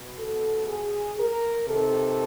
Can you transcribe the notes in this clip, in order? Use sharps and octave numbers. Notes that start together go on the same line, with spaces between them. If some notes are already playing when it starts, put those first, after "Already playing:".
Already playing: B2
A4
G#4
A#4
C3 D#3 A4